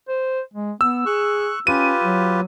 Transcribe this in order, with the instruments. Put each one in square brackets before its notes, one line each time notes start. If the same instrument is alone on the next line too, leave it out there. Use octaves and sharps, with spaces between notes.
[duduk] C5
G#3
[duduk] B3 [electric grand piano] E6
[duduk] G#4 [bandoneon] C#6 F#6
[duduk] C#4 [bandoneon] F4 G4 B4 [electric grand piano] D#7
[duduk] F#3